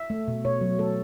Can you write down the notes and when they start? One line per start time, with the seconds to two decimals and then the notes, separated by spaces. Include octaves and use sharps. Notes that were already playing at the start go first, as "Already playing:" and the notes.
Already playing: E5
0.10 A3
0.28 B2
0.45 B2 C#5
0.61 F#3
0.79 A3 A4